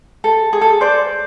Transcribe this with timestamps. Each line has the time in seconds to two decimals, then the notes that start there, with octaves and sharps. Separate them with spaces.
0.24 A4
0.53 G#4
0.61 A4
0.81 C5 D5